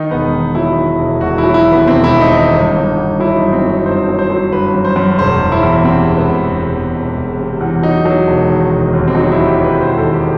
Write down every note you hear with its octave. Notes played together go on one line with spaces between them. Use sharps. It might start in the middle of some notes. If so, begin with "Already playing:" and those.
Already playing: D#3 D#4
E1 B3
D#3
F#3 E4
D#3
E4
E1
E1 F#4
E4
F#3
E4
D#2
B3
E1 C4
E4
E1
D#4
D#3 D#4
G1
G1
G1
F#3 E4
D#4
F#2
C4
F#3
D#4
G1 C5
F#3
C5
F#3
G1 B4
F#2
C5
F#2
E1 C5
E1
E4
E2
C3 C4
E1
B3
E1
E1
E2
E1
E1
C3
E2
F#3 D#4
F#3
E1
D#3
E1
D#2
C4
F#3 D#4
E4
D#2
G4
D#2 B4
E1 C5
D#3 A4
G4